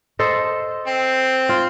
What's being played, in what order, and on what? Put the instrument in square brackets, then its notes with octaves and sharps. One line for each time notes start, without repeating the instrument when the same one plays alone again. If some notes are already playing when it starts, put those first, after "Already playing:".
[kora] A4 C5 D#5
[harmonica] C4
[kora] F4